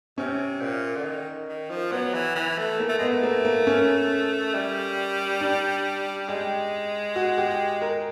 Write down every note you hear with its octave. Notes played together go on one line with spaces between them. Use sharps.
C3 C#4
A#2
D3
D#3
D#3
F3
F#3 B3
E3
E3
A3
A#3
A3
G#3 B3
A3
A#3
A#3
C#4
G3
D4
G#3 G4
F#4
G4
A#4